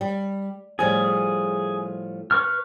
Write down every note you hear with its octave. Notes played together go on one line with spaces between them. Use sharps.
G3
A2 F3 G3 G#4
B4 C#6 F6